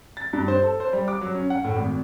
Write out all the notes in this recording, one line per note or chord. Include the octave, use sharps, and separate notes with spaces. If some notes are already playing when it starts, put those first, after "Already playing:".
A6
G2
C5
A4
C5
G3
D6
F#3
C#4
F#5
A2
G#1